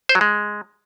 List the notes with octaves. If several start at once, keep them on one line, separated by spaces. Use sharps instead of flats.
C5
F#3
G#3